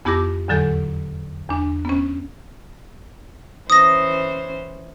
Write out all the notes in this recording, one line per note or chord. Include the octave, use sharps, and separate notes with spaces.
F2 B3 E4 G4 D6 A#6
E2 A2 D3 F#3 A4 G6
E2 D4
B3 C#4
E3 C#4 C5 D#6 A#6